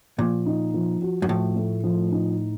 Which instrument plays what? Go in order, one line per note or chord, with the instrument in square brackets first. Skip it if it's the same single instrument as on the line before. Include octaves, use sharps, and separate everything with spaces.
[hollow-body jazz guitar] A#2 [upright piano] F3
[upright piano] D#4
F3
F#4
[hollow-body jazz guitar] F#2
[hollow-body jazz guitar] A2 [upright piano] F3
[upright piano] A3
F3
D#4